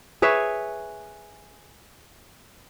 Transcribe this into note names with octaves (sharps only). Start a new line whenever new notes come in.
G#4 B4 C#5 E5